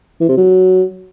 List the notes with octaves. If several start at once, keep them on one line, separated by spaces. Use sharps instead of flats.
E3
C3
F#3